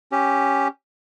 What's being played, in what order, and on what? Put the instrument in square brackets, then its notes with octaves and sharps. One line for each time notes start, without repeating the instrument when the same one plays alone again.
[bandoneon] C#4 G4